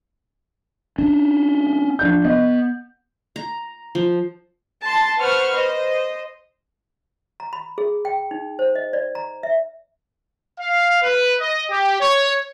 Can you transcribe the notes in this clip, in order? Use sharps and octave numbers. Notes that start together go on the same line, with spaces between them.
C#4 D4
F3 D4 G6
B3 D#5
A#5
F3
A5 C6 A6
B4 C5 F#5 C#6 F6
C5 D#5
A#5
B5
G#4
G5
D#4
C5
D#5
D5
A#5
E5
F5
B4
D#5
G4
C#5